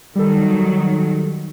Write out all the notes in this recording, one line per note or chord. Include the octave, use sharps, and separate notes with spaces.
D#3 F#3 G3 A4